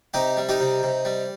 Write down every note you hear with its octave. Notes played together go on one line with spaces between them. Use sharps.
C3 D#4 G4
G3
D#4 G4
C3
C3
G3